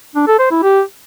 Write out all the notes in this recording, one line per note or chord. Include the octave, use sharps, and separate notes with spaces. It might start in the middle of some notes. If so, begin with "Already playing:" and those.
D4
A4
C5
E4
G4